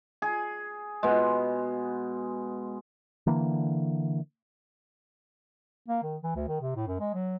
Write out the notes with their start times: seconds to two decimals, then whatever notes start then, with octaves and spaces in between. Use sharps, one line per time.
0.22 G#4
1.03 B2 G#3
3.27 D3 E3 A#3
5.89 A#3
6.03 D#3
6.23 E3
6.35 D2
6.48 D#3
6.61 C3
6.76 A2
6.87 F#2
7.00 G#3
7.14 F#3